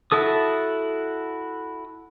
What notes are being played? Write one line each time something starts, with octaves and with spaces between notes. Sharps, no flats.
E4 F#4 A4 D#6